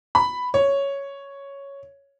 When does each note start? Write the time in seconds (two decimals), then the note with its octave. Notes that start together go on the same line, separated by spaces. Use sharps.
0.15 B5
0.54 C#5